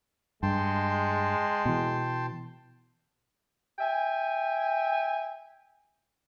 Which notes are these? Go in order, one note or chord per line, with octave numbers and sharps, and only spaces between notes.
G2 G#3 G5 A5 C6
B2 E3
E5 G5 G#5